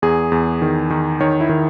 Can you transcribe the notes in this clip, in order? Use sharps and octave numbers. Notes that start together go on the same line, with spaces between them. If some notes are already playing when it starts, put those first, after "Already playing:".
E2 G#4
E2
D#3
D#3
D#3 C#5
E4
D#3